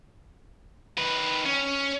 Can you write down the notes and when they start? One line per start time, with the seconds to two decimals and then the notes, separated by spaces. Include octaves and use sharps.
0.98 D#3 B4
1.46 C#4